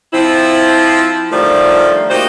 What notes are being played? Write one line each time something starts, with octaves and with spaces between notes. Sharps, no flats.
F3 C4 E4
D3 D#3 F3 G3 A3 D5
A#3 D#4 F#4 G4 C5